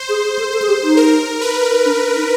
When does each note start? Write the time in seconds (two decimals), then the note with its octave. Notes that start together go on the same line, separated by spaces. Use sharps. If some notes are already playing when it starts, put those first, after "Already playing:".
Already playing: C5
0.09 G#4
0.24 G#4
0.39 A4
0.53 A4
0.62 G#4
0.69 G4
0.83 D#4
0.97 A#4
1.41 B4
1.86 D4
2.16 D#4